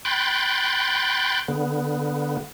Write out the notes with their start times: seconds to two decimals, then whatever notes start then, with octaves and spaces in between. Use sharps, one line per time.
0.05 G5 B5 C6 F#6 G6 A6
1.48 D3 B3